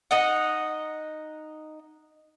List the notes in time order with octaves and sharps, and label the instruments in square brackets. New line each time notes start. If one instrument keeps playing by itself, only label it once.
[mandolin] D#4 D#5 F#5